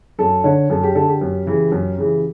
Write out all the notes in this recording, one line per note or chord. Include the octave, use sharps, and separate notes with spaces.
F#2 A4
D3 C#5
F#2 A4
G4
D3 A4
G4
F#2
C#3 E3
F#2
C#3 E3